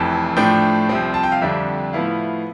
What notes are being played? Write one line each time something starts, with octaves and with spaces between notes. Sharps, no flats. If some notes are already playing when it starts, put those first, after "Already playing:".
Already playing: F1 F2 E3 A5
A2 F3 A3 D4 G5
C2 C3 F3 C4
A5
G5
F5
F2 D3 G3 D4 E5
A2 F3 B3 E4 F5